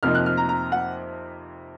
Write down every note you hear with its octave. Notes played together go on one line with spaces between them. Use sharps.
F2 C3 F3 A#3 D#4 F6
F#6
F6
A#5
A#5
F#5